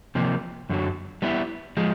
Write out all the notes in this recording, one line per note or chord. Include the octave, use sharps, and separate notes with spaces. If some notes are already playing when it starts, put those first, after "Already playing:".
C3 F3 A#3
F#2 D3 F#3
G3 B3 E4
F3 G#3